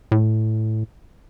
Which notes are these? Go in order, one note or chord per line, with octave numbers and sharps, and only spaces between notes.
A2